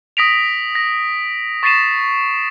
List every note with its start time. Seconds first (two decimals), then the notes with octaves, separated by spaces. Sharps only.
0.17 D#6 A#6 B6 D7 F7
0.75 A#6
1.63 C#6 A6 B6 C7 D#7 E7